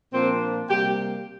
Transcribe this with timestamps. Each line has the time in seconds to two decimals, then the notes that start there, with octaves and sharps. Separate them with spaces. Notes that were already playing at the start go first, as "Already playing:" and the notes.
0.12 A#2 F3 A#3 C4 D4 C5
0.69 C3 G3 A#3 G4 G5